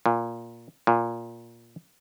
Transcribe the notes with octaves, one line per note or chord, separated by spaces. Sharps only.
A#2
A#2